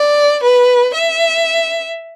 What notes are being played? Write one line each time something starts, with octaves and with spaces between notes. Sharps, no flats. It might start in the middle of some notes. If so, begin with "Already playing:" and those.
Already playing: D5
B4
E5